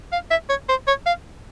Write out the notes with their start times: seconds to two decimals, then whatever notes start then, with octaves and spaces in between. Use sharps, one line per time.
0.12 F5
0.30 E5
0.49 C#5
0.69 C5
0.87 C#5
1.06 F5